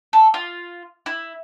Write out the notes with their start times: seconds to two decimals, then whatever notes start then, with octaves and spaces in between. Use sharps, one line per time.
0.13 A4
0.34 F4
1.06 E4